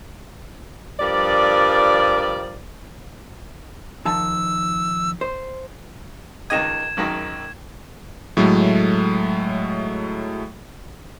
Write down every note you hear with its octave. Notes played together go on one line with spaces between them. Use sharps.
G2 F3 G3 A#4 D5
D#3 F3 A5 E6
C5
C#2 D#3 D#5 G#6 E7
G#1 F#2 D#3
A2 F#3 G#3 A3